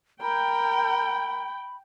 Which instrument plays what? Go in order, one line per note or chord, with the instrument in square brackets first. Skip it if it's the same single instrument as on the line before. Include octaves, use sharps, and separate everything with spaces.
[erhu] A#4 [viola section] G5 [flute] B5